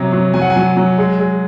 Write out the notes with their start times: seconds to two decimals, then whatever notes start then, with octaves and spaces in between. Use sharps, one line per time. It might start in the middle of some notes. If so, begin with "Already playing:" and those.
Already playing: C3 F#3 A#5
0.13 F#3
0.34 F#3 G#5
0.42 F#5
0.50 G#5
0.56 F#3
0.77 F#3
0.98 G#3
1.19 G#3